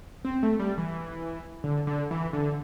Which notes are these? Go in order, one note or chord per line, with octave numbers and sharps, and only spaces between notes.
C4
A3
G3
E3
D3
D3
E3
D3